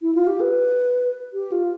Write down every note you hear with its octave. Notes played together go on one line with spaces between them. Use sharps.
E4
F4
G4
B4
G4
F4